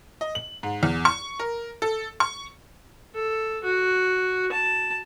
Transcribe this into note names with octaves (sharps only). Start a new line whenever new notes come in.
D#5
F#7
G#2
E2
C#6
A#4
A4
C#6
A4
F#4
A5